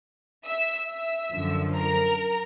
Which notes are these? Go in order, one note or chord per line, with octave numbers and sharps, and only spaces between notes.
E5 E6
E5 E6
F#2 D3 F3
A#4 A#5